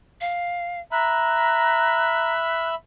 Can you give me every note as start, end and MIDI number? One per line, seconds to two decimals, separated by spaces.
0.21 0.80 77
0.92 2.75 76
0.92 2.33 82
0.92 2.75 83
0.92 2.68 90